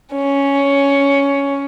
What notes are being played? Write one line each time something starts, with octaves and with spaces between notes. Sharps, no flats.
C#4